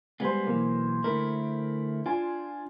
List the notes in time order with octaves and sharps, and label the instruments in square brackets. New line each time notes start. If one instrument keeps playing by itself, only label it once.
[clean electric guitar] G3 G#3 B3 [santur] C5 G#5
[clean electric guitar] B1 E3 [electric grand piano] A#3
[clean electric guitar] D3 A3 E4 [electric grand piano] A#4
[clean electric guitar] D4 [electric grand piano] F4 G#5 C6